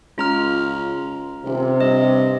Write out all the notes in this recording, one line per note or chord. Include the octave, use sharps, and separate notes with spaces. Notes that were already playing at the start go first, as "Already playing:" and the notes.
C#2 F4 A#5 F6
D#1 C3
G2 D#5